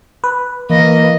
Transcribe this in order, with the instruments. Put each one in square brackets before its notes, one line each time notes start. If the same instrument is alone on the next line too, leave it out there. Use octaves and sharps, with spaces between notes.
[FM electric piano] B4
[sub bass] E3 [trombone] A#3 [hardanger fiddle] D#5